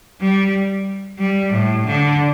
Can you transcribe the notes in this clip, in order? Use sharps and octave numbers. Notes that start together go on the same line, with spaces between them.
G3
G3
A2
D3